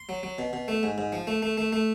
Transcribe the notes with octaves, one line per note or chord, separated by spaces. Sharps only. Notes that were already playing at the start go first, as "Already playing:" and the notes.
Already playing: C6
F#3
F#3
B2
B2
A3
G#2
G#2
F3
A3
A3
A3
A3